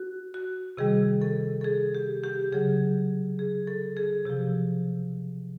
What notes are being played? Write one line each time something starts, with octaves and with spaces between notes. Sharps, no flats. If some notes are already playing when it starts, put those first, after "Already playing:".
Already playing: F#4
F#4
C3 D#3 G3 G#4
A4
A4
G#4
G4
G4
C#3 F#3 G#4
G#4
A4
G#4
C3 F3 G4